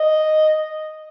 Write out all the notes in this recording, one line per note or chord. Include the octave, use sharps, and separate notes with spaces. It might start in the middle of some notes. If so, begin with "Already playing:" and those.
Already playing: D#5